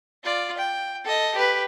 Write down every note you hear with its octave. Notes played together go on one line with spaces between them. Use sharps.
F4 D5
G5
A4 D#5
G4 B4